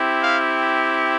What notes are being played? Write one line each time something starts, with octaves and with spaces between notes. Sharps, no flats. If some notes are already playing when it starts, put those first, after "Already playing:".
Already playing: C4 E4 G4
F5